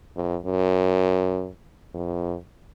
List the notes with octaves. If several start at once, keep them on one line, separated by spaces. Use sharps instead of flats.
F2
F#2
F2